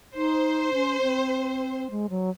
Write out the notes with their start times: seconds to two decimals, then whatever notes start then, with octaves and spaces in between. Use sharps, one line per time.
0.15 D#4 C5
0.74 C#4
1.02 C4
1.91 G#3
2.10 F#3